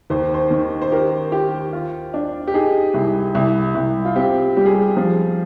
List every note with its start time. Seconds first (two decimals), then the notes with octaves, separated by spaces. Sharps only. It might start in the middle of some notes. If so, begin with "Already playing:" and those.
0.10 D#2 C5
0.34 C5
0.51 D#3
0.82 C5
0.92 G4 A#4
1.32 G4
1.73 F4
2.14 D4
2.47 G4
2.54 D#4 G#4
2.94 C2
3.35 C2
3.75 C2
4.05 F4
4.16 C4 G4
4.56 G3 G4
4.65 G#4
4.75 G4
4.97 F3 G#4